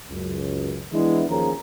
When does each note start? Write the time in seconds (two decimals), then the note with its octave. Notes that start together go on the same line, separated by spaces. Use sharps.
0.10 C#2 F#2
0.92 E3 G#3 B3 D4 E4
1.29 D#2 F3 C#4 G#4 A#4 A#5